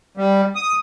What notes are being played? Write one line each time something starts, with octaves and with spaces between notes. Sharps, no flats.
G3
D#6